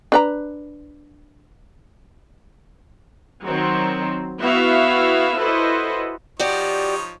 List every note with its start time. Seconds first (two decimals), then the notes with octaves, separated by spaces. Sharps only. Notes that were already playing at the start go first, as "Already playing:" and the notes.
0.12 D4 B4 A#5
3.45 D#3 F#3 C4
4.40 B3 E4 F#4 E5 F5
5.37 E4 F#4 A4 B4 C5 D#5
6.39 F3 D#4 F#4 G4 C#5 D5